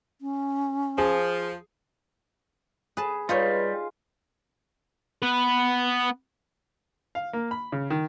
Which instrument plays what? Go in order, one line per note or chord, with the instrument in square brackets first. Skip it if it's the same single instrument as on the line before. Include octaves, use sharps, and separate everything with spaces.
[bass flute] C#4
[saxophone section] F3 [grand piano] G#4
[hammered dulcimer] G#4 [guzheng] B4 A5
[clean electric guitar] G3 [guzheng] D#4 G#4 C#5 [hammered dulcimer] F4 [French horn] B4
[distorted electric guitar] B3 B4
[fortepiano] F5
A#3
B5
C#3
D#3